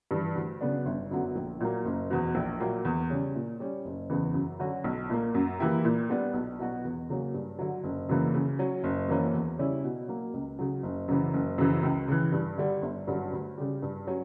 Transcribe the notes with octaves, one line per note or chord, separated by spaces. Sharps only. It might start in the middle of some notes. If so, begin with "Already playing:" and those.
G2 E3
D2
C#3 F#3 B3 D4
G1
F#2 D3 F#3 B3
A#1
A#2 F#3 A#3
F#1
E2 B2
A#1
A#2 F#3 A#3
E2
C#3 G3 C#4
A#2
G3 C#4
F#1
E2 C#3 E3
F#2
D3 F#3 C#4 F#4
B1
A#2 A#3
F#2
E3 A#3 E4 G4
A#2
G3 B3 D4
B1
B2 F#3 B3 F#4
E2
C#3 F#3 A#3 C#4
G2
D3 F#3
F#1
F#2 C#3 E3 A#3
C#3
F#3 C#4
F#1
F#2 E3 A#3 C#4
E2
C#3 G3 C#4 E4
B2
F#3 A#3
C#2
C#3 F#3
F#1
F#2 C#3 E3
F#1
F#2 C#3 E3
C#2
C#3 E3
G2
D3 G3
G1
G2 D3 F#3 C#4
D2
C#3 G3
G2
F#3 C#4